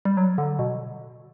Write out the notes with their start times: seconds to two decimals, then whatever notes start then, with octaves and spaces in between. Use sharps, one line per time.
0.05 G3
0.17 F#3
0.38 D3
0.59 B2